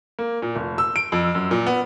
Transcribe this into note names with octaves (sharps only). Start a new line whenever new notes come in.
A#3
A#2
F1
E6
D7
F2
F#2
A#2
B3